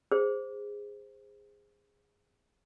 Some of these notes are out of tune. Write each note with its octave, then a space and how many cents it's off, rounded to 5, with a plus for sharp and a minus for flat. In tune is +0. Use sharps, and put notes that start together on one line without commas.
G#4 -15 C5 +0